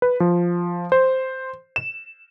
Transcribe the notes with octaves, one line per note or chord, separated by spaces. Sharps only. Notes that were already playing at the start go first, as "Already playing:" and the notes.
B4
F3
C5
E7